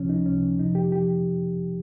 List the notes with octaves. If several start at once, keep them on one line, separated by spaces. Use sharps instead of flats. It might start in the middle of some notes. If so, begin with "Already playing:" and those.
Already playing: C#2 C3 F3 C#4
D#4
C#2 C3 F3 C#4
F2 C3 F3 D#4
G4
F3 G4